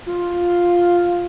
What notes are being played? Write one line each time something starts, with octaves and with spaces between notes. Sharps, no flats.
F4